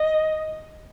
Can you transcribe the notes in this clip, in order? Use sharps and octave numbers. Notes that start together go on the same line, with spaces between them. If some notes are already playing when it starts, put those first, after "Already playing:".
Already playing: D#5